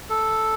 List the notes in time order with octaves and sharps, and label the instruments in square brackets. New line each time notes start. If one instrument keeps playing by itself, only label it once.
[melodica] A4